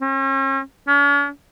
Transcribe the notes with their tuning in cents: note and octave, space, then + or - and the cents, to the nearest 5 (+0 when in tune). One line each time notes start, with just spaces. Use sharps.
C#4 -40
C#4 +45